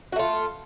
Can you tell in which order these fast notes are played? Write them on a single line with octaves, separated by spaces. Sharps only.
F#4 A3 F4